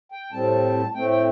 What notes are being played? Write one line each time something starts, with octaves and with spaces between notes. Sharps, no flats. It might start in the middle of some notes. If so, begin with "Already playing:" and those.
G5
A2 G3 C4 A5
A2 A3 C4 G5
G5